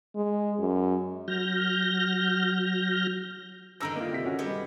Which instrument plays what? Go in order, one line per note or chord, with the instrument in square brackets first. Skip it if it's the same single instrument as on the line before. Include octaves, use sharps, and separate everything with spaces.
[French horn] G#3
F#2
[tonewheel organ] F#3 F6 G6 A#6
[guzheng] G2 D3 D#3 [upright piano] A#5 E6 A#6
[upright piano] A#3 F4
C3 F4 B6
C#4 F#4
[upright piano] G3 G4 [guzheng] G#3 B3